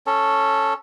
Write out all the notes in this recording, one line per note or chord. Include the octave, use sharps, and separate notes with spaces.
C#4 A4